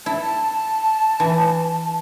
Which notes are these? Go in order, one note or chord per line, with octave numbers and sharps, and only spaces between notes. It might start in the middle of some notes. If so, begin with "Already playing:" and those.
E4 A5
E3